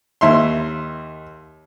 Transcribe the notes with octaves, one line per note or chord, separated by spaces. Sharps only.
D#2 E5 C6